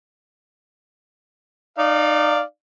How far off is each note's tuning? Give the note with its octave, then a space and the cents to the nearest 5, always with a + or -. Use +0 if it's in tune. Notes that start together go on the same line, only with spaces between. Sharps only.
D#4 -30 D5 +0 F5 +0